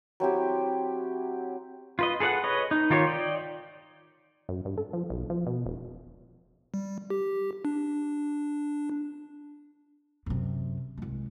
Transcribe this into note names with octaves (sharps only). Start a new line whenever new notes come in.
F#3 C4 E4 G4
F4 B4 D#5
G#4 A4 B4 D5 F#5
B4 C#5 D#5
D#4
D#3 F4 G4 C#5
D5 D#5 G5
F#2
G2
A4
F3
B1
F3
B2
E1
G3
G4
D4
F#2 C3
C2 G#3